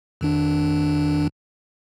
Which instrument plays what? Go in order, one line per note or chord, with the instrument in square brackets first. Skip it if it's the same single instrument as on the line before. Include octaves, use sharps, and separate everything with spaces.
[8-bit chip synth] F2 D#3 D4